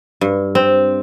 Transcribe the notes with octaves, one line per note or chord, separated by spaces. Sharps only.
G2
C4